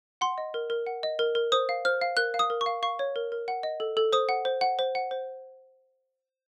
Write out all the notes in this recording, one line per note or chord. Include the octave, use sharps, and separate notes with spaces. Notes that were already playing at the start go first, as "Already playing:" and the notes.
F#5 C6
D#5
A#4
A#4
F#5
D#5
A#4
A#4
C5 D#6
F5
C5 F6
F5
A#4 F#6
F5
D#6
A#4
C#6
F5
F5 C#6
C#5
A#4
A#4
F#5
D#5
A4
A4
C5 D#6
F#5
C5
F#5
C5
F#5
C5